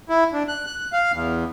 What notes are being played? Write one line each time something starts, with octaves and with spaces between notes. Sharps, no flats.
E4
D4
F#6
F#6
F5
E2